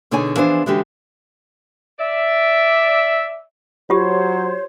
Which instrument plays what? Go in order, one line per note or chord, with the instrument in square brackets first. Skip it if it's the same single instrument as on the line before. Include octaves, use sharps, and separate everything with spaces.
[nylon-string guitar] B2 D3 D#4 G#4 C#5 G#5
E3 F3 B3 D4 G#4 C5
D3 E3 G#3 C#4 F#4 G4
[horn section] D5 E5
[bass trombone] F#3 [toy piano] F4 G4 [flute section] C5 C#5